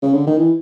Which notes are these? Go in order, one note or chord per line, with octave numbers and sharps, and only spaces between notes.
C#3
D3
D#3
E3